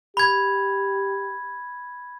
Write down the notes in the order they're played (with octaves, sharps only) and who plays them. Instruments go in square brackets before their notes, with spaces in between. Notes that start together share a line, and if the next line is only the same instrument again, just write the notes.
[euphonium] G4 [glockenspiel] B5 G#6